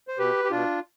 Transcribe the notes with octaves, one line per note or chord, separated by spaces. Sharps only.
C5
B2 G4 B4
G4
B2 D4 F4